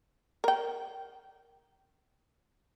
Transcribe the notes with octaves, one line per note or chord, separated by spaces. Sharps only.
A#4 G5